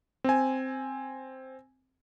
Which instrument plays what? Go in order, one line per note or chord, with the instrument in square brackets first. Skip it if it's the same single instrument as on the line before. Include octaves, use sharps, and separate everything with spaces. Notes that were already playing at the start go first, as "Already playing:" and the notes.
[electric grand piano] C4 G#5